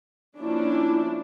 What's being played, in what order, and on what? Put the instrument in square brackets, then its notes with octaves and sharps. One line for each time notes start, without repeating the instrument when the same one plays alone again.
[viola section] F3 A#3 C#4 D4 E4